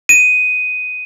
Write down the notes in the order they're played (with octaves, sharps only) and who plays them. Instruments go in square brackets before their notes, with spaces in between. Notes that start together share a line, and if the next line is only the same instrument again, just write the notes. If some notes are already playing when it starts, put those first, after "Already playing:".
[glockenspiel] D#7